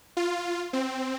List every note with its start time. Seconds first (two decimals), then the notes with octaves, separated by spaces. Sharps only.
0.17 F4
0.73 C4